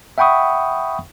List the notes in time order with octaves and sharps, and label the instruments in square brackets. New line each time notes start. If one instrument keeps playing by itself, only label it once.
[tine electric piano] E5 F#5 G5 B5 C#6 D#6